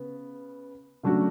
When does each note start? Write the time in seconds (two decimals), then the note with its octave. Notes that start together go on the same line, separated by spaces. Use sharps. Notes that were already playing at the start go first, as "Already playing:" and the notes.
Already playing: C#3 B3
1.03 C#3 F#3 A3 D4 F#4